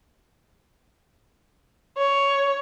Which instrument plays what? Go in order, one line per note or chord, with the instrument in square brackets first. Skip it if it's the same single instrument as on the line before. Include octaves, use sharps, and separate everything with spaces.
[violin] C#5